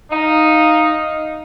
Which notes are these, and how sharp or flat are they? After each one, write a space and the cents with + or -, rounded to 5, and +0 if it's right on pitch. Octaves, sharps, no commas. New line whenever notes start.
D#4 +0 F5 +0